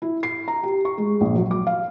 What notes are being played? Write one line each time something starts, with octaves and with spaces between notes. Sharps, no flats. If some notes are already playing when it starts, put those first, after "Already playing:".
E4
C7
A#5
G4
C#6
G#3
A#1
F#3
D6
F5